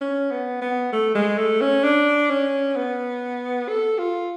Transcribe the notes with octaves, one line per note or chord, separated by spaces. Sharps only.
C#4
B3
B3
A3
G#3
A3
C#4
D4
C#4
B3
A4
F4